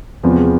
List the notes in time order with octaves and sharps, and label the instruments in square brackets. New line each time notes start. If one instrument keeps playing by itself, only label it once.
[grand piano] E2 C3 F3 G#3 B3